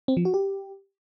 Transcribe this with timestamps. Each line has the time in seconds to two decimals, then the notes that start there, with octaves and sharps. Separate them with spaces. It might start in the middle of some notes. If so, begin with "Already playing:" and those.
0.08 C4
0.17 F3
0.25 F#4
0.34 G4